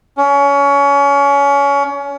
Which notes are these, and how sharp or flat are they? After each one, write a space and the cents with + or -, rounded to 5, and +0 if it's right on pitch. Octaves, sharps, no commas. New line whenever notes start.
C#4 +25